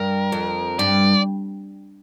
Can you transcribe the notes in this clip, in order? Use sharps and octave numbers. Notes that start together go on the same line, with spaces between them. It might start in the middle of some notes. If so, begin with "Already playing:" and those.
Already playing: G2 A#4
F2
G2 D5